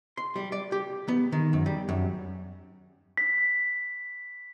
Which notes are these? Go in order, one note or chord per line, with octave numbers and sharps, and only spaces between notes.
C6
G3
D5
G4
B3
D#3
F#2
G3
F#2
B6